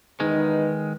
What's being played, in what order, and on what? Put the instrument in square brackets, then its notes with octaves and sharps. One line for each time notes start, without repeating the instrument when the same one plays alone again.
[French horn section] E2 D#4 B4 [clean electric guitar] D#3 G#3